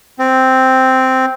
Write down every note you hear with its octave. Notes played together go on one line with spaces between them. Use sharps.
C4